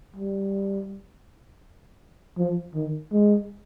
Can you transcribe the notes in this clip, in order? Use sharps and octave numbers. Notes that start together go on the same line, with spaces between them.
G3
F3
D#3
G#3